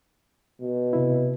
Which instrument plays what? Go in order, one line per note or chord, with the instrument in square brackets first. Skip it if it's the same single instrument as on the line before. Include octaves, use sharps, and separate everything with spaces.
[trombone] B2
[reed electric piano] C3 E4